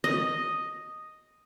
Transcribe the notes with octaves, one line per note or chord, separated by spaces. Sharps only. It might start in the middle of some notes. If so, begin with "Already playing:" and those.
D#5